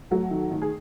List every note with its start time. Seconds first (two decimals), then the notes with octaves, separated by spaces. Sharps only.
0.11 F#3 A3 F#4
0.31 D#3
0.51 D#3
0.62 G#4